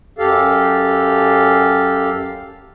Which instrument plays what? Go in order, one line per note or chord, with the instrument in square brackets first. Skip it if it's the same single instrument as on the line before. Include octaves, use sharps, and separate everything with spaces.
[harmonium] F#2 G4 A4 F5